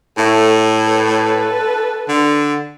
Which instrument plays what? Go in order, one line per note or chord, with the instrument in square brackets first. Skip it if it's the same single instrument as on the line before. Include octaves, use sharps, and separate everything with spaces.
[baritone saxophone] A2 [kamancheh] A3
[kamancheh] A4 B4
[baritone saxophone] D3